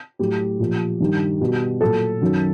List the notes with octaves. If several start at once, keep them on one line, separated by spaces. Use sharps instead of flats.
A2 F#3 G4
A#2 F3
G2 D#3 G3
B2 G3
A#2 F#3 A4
F#2 D#3 F#3